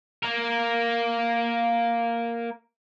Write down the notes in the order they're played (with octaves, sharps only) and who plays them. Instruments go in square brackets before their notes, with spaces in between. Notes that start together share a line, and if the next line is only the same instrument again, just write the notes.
[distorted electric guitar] A#3 A#4